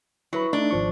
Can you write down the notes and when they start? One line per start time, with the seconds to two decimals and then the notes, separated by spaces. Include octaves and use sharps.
0.33 F#3 E4 B4 B5
0.53 A3 D4 D#4
0.71 G#1 F3 C#6